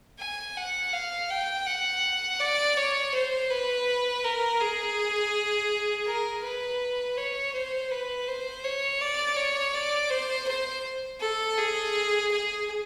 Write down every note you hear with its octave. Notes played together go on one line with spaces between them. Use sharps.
G#5
F#5
F5
G5
F#5
D5
C#5
C5
B4
A#4
G#4
A#4
B4
C#5
C5
B4
C5
C#5
D5
C#5
D5
C5
C5
A4
G#4
G#4